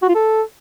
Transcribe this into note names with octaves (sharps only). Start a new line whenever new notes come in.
F#4
F4
A4